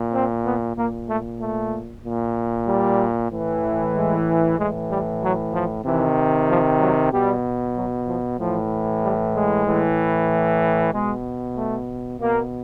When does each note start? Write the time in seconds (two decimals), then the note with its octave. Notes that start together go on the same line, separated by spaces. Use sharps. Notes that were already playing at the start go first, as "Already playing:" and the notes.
Already playing: A#2
0.13 C4
0.45 B3
0.77 A#2 A#3
1.08 A3
1.40 A3
2.04 A#2
2.67 G3
3.31 A2 E3
3.95 G#3
4.58 A2 E3 G#3
4.89 G3
5.21 F#3
5.53 F3
5.85 C3 D#3 E3
6.49 F3
6.80 F#3
7.12 B2 G3
7.75 F#3
8.07 F3
8.39 A2 E3 F3
9.02 G3
9.34 G#3
9.66 A2 E3
10.93 B2 G#3
11.57 A3
12.20 B2 A#3